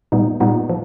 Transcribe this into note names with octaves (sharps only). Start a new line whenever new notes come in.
A#2 G3 B3 D#4
A#2 G3 B3 D#4
F3